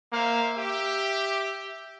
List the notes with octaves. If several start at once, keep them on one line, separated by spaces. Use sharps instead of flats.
A#3 C5 E5 F5
G4 E5